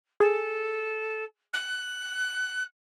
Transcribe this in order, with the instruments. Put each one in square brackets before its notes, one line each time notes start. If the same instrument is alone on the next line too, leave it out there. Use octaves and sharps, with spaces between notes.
[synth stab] G#4 [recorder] A4
[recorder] F#6